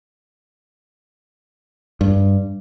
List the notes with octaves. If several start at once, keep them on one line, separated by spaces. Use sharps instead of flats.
G2